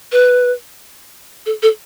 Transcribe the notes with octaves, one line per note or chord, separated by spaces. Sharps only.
B4
A4
A4